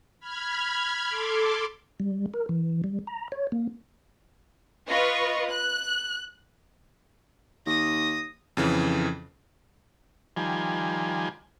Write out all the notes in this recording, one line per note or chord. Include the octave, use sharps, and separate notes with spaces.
B5 F6 G#6
A4 C6 D6
G3
A#4
E3
G3
A#5
C#5
A#3
F4 B4 D#5 C#6
F#6
D#2 D#6 A#6
F2 C#3 E3
D#3 F3 G3 G#5